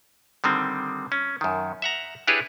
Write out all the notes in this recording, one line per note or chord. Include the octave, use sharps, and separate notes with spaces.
D3 D#3 G3 C4
C#4
F#2 D#3
E5 F#5 A#5
D4 E4 G4 G#4 B4 C#5